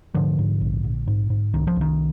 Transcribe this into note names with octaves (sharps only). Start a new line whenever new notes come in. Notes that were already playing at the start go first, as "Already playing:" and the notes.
G#2 D3 F3
G#2
A#1
A#1
G#2
G#2
C2 D#3
F3
C2
D#3